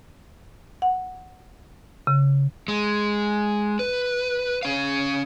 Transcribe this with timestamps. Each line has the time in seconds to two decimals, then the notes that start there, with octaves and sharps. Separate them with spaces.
0.82 F#5
2.07 C#3
2.68 G#3
3.79 B4
4.63 C#4 F5